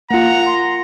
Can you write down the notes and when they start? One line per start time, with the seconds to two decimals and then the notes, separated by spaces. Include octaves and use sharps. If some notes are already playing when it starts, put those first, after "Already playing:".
0.11 A#3 F4 F#5 A#5
0.46 C6